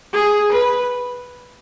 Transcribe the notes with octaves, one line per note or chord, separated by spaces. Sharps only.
G#4
B4